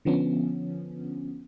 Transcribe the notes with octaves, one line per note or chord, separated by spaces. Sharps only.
D3 F3 B3 C#4